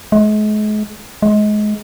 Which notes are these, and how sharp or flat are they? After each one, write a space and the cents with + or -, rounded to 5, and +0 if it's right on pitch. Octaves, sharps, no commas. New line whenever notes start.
G#3 +40
G#3 +25